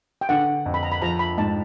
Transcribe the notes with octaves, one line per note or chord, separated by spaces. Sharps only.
G5
D3 F#5
F2
B5
A#5
B5
F3 A#5
B5
G#2 A5